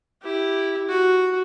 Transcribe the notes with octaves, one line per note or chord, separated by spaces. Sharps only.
E4 G4
F#4